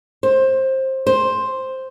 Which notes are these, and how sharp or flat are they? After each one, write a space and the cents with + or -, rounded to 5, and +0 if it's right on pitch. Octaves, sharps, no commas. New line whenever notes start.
C5 +20
C5 +5